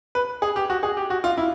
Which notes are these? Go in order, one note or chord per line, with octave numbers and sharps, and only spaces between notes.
B4
G#4
G4
F#4
G#4
G4
F#4
F4
E4